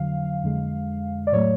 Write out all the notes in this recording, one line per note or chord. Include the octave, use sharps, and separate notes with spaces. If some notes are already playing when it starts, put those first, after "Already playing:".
Already playing: F2 D3 F#3 F5
F2 D3 G#3
D5
A2 F#3 A3 C#5